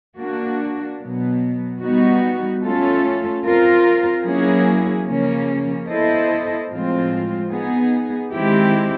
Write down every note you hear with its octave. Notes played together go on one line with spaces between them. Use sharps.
A#3 D4 F#4
B2 F#3 B3
G3 B3 D#4 F#4
A3 C#4 F4 A4
C4 F4 A#4
F#3 A#3 C#4 E4 G#4
C#3 F3 A#3 C#4
B3 E4 A4 C5 D#5
A2 F3 G#3 C4 F4
B3 D#4 G#4
D#3 G#3 C4 E4 G4